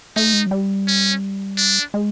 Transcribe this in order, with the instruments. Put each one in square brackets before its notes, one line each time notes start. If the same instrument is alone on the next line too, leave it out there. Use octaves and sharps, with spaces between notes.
[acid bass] A3 [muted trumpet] D#4
[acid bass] G#3
F#3
G3
[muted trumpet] C#4
D4
[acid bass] G#3